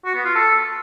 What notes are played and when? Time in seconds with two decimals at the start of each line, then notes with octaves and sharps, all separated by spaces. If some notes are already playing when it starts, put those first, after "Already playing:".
0.05 F#4
0.15 B3
0.25 F4
0.35 A4